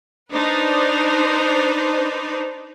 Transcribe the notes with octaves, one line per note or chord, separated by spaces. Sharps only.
D4 D#4 B4 C5